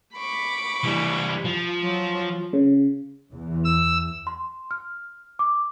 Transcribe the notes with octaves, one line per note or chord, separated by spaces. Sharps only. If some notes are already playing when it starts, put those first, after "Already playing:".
B5 C#6 D6
E3 G3
F3
F#3 F4
C#3
E2 E3
E6
C6
F6
D6